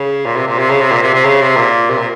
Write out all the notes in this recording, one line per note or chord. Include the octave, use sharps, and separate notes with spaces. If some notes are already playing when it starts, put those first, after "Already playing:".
Already playing: C#3
A#2
C3
A#2
C3
C#3
C3
A#2
C3
C3
C#3
C3
A#2
C3
A#2